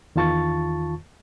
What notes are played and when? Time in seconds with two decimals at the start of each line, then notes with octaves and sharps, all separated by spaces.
0.16 E2 D#3 F4 A5 C#6 A6